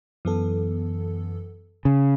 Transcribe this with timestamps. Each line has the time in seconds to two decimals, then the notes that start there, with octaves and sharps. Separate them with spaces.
0.25 F#2 E3 B3 A4
1.85 C#3